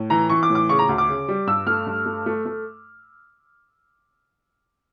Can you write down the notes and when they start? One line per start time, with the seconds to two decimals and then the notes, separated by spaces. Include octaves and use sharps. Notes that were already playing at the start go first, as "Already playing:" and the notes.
Already playing: A2
0.10 E3 A#5
0.29 E3 C#6
0.43 D6
0.50 A2
0.55 D6
0.69 C#3 C#6
0.79 A#5
0.89 D2
0.98 D6
1.08 C#3
1.28 G3
1.47 G2 E6
1.67 A3 F6
1.87 G2
2.06 A3
2.26 A3
2.46 A3